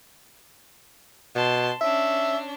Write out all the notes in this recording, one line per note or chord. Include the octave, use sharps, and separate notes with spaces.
B2 A5 C6
C#4 D4 E5